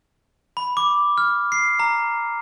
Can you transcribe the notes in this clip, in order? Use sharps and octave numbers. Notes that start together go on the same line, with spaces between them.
B5
D6
F6
C7
A#5